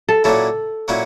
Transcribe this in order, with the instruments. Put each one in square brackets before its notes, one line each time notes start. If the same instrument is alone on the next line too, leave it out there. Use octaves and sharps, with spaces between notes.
[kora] A4
[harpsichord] A#2 F#3 A#3 C#4 E4 [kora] A4
[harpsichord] A#2 F#3 A#3 C#4 E4